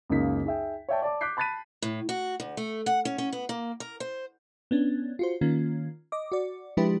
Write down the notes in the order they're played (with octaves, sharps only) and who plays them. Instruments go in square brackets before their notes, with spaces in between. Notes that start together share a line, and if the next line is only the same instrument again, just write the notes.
[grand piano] C#2 F#2 C#3 A#3 D#4 B6
D#4 G#4 E5 G5
C#5 D5 E5 G5 A5 C#6
D5 A5 D6
D6 F#6 G6 B6 C7
A5 B5 F#6 A6 B6 D#7
[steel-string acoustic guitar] A2
F#4
D2
A3
F#5
C#4
C#4
B3
A#3
A#4
C5
[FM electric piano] B3 C#4 D4
F4 F#4 C5
D#3 A#3 C#4 F4
D#5 D6
F#4 D5
F3 G#3 D4 E4 G4 B4